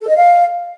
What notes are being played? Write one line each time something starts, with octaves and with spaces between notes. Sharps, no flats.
A4
D#5
F5